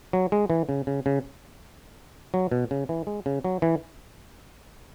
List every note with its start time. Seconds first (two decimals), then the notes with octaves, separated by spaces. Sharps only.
0.13 F#3
0.32 G#3
0.50 E3
0.69 C#3
0.87 C#3
1.06 C#3
2.34 F#3
2.52 B2
2.71 C#3
2.89 E3
3.07 G#3
3.26 C#3
3.44 F#3
3.62 E3